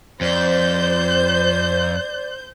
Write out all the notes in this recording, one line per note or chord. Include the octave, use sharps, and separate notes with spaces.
F2 C5 D5 G6